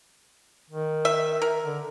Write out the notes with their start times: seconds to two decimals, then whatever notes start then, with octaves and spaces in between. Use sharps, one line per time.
0.70 D#3
1.05 E5
1.42 A#4
1.63 D3